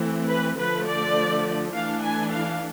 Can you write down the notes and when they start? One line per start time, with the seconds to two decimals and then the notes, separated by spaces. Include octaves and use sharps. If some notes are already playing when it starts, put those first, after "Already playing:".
Already playing: E3 A3 C4
0.28 B4
0.57 D3 F3 A3 B4
0.86 D5
1.73 E3 A3 D4 F5
2.03 G#5
2.31 F5